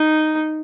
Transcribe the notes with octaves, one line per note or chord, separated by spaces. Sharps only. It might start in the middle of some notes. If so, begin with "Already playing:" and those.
Already playing: D#4